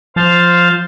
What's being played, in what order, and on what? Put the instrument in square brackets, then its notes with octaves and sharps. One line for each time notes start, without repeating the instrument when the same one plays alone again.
[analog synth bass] F3 [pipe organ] C5 F5 A6